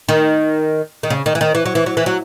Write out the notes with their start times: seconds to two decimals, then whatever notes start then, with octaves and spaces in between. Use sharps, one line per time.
0.09 D#3
1.03 D#3
1.10 C#3
1.26 D#3
1.35 E3
1.41 D#3
1.55 E3
1.65 F#3
1.75 E3
1.86 F#3
1.97 E3
2.06 F#3